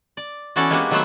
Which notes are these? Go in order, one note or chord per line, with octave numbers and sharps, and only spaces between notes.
D5
E3 B3 C#4 F#4 A4 D5
G#3 A#3 B3 D4 F#4 G4
D#3 F#3 A3 B3 C5 E5